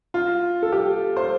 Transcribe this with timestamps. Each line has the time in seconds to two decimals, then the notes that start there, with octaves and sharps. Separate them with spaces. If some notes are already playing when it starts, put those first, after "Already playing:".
0.14 F4
0.63 A4
0.72 G4
1.17 C5